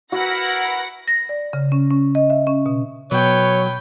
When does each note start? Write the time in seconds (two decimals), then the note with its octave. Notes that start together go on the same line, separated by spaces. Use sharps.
0.12 E4 F#4 A#4 B4 F#5 A#6
1.08 A#6
1.29 D5
1.53 C#3
1.72 C#4
1.91 C#4
2.15 D#5
2.30 E5
2.47 C#4
2.66 B2
3.11 B2 F#3 B4 C#5 G5